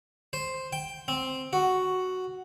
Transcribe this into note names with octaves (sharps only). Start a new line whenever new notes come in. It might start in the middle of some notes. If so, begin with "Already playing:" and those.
C5
G5
C4
F#4